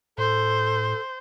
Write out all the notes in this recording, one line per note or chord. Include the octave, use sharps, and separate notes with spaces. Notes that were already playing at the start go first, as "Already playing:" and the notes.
A2 A4 C5